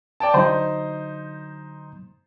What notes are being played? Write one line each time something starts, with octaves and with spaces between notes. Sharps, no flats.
D5 G5 A5
D3 F#3 D#4 C5